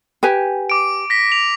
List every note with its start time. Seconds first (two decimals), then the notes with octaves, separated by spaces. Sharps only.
0.23 G4 B4 G#5
0.70 D6 D7
1.10 A#6 B6
1.32 F7